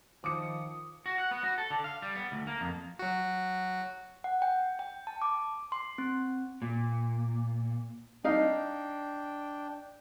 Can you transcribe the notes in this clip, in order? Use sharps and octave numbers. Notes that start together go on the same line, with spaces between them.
D#3 F3 D6 D#6 C#7
F#4
F#5
B3
F#4
A4
D3
F5
G3
B3
D2
A#3
F2
F#3 F#4
F#5
G5
G5
A5
D6
C6
C4
A#2
D4 D#4 F5 G5